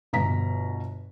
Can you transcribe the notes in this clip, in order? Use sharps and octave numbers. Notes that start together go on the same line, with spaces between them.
G1 B2 A#5 B6